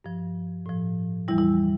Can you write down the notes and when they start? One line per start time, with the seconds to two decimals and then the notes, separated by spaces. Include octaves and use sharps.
0.04 G2 F3
0.66 A2 F3
1.28 E2 E3 G3 E4
1.38 E4